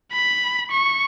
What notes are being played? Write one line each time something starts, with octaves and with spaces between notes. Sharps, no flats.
B5
C#6